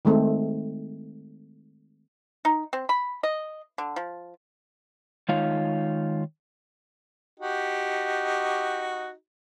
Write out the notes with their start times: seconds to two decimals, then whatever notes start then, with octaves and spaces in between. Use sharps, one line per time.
0.05 D#3 G#3 A3 C4
2.45 D#4
2.73 C4
2.89 B5
3.23 D#5
3.78 D3
3.96 F3
5.29 D#3 G#3 D#4 F4 C#5 F5
7.40 D#4 F#4 G4